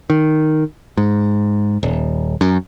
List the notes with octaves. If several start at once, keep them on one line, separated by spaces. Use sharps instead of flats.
D#3
G#2
D#1
F#2